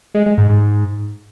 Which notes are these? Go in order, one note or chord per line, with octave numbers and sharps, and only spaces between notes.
G#3
G#3
G#2
G#2